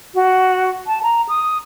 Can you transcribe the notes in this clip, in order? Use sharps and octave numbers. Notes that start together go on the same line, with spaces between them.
F#4
A5
A#5
D#6